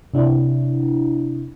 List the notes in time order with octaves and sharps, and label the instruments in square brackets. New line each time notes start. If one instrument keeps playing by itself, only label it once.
[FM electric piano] C3 D4 E4